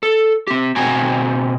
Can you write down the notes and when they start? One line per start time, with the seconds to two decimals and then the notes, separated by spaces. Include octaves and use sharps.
0.03 A4
0.47 C4 G4
0.76 B2 C4 F#4 G5 G#5 A#5